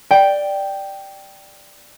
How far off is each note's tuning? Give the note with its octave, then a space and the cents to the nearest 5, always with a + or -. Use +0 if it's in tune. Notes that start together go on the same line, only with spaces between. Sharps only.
D5 +5 G5 +0